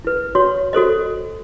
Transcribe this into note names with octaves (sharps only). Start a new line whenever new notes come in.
E4 B4
F#4 C#5 C6
F#4 A4 C5 D#5